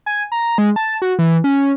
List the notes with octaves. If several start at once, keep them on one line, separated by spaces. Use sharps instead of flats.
G#5
A#5
G#3
A5
F#4
E3
C#4